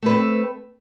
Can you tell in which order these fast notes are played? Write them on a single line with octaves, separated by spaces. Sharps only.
A3 B4 C4